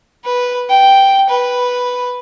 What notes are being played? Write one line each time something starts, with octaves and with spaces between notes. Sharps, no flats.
B4
G5
B4